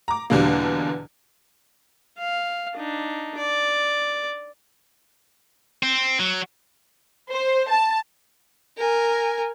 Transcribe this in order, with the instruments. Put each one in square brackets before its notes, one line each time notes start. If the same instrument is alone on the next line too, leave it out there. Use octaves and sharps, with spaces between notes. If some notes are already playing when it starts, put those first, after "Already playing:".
[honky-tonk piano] A#5 D6
E2 B2 D3 G3 A#3
[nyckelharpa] F5
D4 D#4
D5
[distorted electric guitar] C4
F#3
[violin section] C5
A5
[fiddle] A#4 G#5